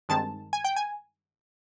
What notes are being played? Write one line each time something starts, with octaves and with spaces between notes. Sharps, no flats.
G2 D#3 G#3 C4 A5
G#5
G5
G#5